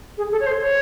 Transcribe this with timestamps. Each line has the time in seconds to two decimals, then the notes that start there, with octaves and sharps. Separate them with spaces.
0.17 G#4
0.31 A4
0.40 C#5
0.46 C5
0.60 C#5